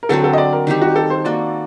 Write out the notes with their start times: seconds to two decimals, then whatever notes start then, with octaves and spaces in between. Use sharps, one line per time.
0.03 A#4
0.09 D3 F#3 C4 F#4 A4
0.24 A4
0.33 D#5
0.38 D5
0.53 A#4
0.67 D#3 G3 C4 G4
0.81 F#4
0.96 A4
1.10 C5
1.25 A#3 F#4 A4 D5